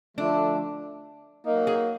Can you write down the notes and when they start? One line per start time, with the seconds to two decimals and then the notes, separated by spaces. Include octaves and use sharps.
0.17 D3 F3 A3 D4
1.45 F#3 A#3 D#4
1.67 G#4